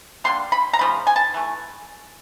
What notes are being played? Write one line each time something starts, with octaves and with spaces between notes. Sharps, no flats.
D3 G3 A#3 C6
B5
A#5
C#3 F3 A3 B5
G#5
A5
E3 A3